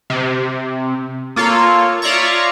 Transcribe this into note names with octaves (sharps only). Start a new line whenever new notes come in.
C3
A#3 F4 A4 C#5
F4 C#5 D5 E5 A#5 C#6